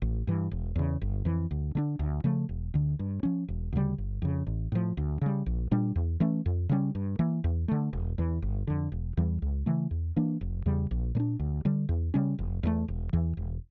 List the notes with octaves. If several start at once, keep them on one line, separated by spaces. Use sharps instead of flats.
A1
G2 E3
E1
E2 C#3
G1
F2 E3
D2
D3 A3 D4
D2
C#3 F3 A3
E1
D2 D3
G2
F3 C#4
E1
D2 C#3 G3
G1
F2 C#3
A1
A2 F3
D2
C#3 G3
A#1
A#2 G3 D4
E2
E3 A3 C#4
F2
C#3 G3 C#4
G2
E3 A#3
E2
D3 A3
E1
E2 E3
G1
F2 D3
E1
E2 E3 G3
C#2
C#3 E3 A3
E2
E3 A#3 D4
F1
E2 C#3 G3
A#1
A#2 A3 D4
D2
D3 G3
E2
C#3 G3 C#4
F1
E2 E3 A3
E1
E2 E3
E1